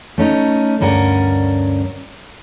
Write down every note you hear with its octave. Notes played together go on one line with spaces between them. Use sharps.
A3 C#4 D#4
D2 G2 C#4 A#4 D5 F#5